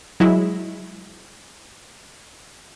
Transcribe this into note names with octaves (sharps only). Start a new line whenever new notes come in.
F#3 G#3 E4